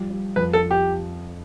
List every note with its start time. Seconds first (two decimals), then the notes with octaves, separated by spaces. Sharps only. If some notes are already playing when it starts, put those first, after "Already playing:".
Already playing: F3 G3
0.10 G3
0.36 F2 B4
0.53 A4
0.62 F3
0.71 G4